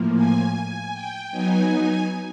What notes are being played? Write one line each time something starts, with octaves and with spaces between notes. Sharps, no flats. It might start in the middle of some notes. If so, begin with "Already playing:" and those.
Already playing: A2 F3 A#3
G#5
G#5
G5
F#3 B3 D#4 G#5